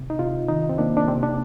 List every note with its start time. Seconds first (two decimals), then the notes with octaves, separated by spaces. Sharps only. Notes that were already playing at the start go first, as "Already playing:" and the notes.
Already playing: C3
0.10 D#4
0.19 C3 F4
0.48 D#3 D#4
0.69 C4
0.78 A#3 D4
0.97 D4
1.08 C3 C4
1.23 D4